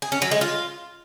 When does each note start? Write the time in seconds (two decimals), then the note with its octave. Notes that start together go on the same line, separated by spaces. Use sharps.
0.02 G#4
0.12 C#4
0.22 F#3
0.31 G#3
0.41 F4